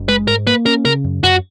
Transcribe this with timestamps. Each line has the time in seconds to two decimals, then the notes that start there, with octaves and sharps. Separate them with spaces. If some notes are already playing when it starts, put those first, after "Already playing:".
Already playing: F#1
0.09 G#3 B4
0.28 G#2 A#4
0.47 A#3 B4
0.66 C#4 A#4
0.85 C#3 A#4
1.04 F#2
1.23 F#2 F#4